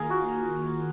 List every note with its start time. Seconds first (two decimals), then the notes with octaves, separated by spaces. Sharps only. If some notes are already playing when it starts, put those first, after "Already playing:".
Already playing: D#3 A#3 F4 G#4 A#4
0.10 F#4